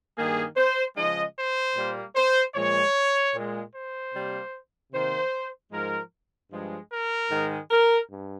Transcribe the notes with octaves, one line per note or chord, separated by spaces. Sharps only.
G2 D#3 A#3 G#4
C5
C#3 F3 G#3 D#5
C5
A#2 G3 A#3
C5
A#2 F3 G#3 C#5
A#2 G#3
C5
C3 G3 A#3
C3 D#3 A#3 C5
G#2 F3 G#3 A#4
G2 F3 G#3
A#4
G#2 D#3 G#3
A#4
G2